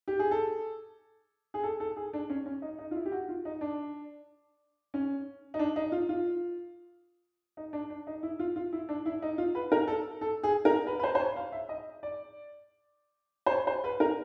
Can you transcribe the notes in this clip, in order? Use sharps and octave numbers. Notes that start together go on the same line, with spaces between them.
G4
G#4
A4
G#4
A4
A4
G#4
D4
C#4
C#4
D#4
D#4
F4
E4
G4
F#4
F4
D#4
D4
C#4
D#4
D4
D#4
F4
F4
D#4
D4
D4
D#4
E4
F4
F4
E4
D4
E4
D#4
F4
B4
A#4
A4
A4
G#4
A#4
B4
B4
C5
C5
C#5
F5
E5
D#5
D5
C5
C#5
C5
B4
A#4